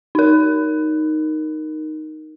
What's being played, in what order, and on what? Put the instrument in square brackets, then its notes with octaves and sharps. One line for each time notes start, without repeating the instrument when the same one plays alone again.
[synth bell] D#4 A#4